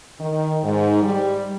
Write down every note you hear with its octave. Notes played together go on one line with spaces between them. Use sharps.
D#3
G#2
G3